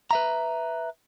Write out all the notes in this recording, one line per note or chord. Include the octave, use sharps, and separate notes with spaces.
B4 E5 A#5